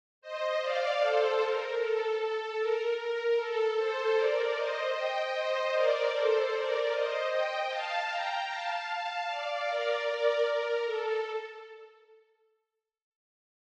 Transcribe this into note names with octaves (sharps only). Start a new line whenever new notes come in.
C5 D#5
D5 F5
A4 C5
A#4
A4
A4
A#4
A#4
A4
A4 C5
A#4 D5
C5 D#5
D#5 G5
C5 D#5
A#4 D5
A4 C5
A#4 D5
C5 D#5
D#5 G5
F5 A5
G5 A#5
F5 A5
F5 A5
D5 F5
A#4 D5
A#4 D5
A#4
A4